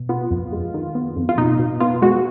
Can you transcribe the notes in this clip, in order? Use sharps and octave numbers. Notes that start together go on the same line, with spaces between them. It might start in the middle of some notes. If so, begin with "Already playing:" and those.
Already playing: B2
B3 F4
F2
G#3
D#3
B3
F2
F4
B2 D#4
B2
B3 F4
G#3 F#4